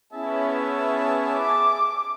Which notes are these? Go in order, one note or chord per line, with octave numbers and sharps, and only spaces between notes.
B3 C#4 E4 G#4 E5 A5
D6